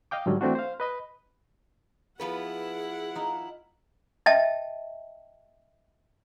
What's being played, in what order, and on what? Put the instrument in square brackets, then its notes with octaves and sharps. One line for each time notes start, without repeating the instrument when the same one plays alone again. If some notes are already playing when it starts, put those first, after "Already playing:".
[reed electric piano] D#5 F5 G5 D6
G#2 D3 F#3 G3
E3 A3 C4 D4 F#4
C5 F5
B4 D#5 B5
[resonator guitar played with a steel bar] F3 B3 B4 [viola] E4 F#5 [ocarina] G#4
[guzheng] D#4 F4
[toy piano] D#5 E5 G5 A5